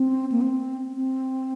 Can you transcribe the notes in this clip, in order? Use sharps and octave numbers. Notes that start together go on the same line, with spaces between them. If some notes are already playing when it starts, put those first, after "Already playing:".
Already playing: C4
A#3
C4
C4